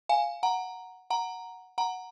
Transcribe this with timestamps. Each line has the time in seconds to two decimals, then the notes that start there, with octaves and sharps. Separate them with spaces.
0.09 F5 G#5
0.43 F#5 A#5
1.10 F#5 A#5
1.78 F#5 A#5